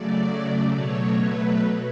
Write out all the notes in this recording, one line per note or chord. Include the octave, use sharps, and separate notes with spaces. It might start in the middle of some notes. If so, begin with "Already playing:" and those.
Already playing: C#3 F#3 A3 D5
B2 F#3 A3 C#5
B4